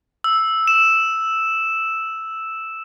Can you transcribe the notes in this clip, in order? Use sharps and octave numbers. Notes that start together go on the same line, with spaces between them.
E6
E7